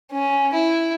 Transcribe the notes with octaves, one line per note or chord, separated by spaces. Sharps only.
C#4
E4